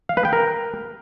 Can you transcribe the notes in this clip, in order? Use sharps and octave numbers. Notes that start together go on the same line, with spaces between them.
F5
B4
G5
A#4